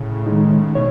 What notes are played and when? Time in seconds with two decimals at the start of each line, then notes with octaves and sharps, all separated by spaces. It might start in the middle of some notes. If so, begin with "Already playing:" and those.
Already playing: A2 C#3
0.27 D#3 G#3 D#4
0.75 B2 C#5